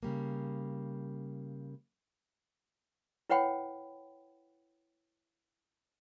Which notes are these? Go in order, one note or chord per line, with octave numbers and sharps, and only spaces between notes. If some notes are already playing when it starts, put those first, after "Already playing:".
C#3 G3 A#3
E4 B4 C#5 F#5 G5 B5